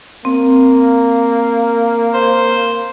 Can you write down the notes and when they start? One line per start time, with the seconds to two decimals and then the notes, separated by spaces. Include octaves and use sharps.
0.25 A#3 C4
2.14 C5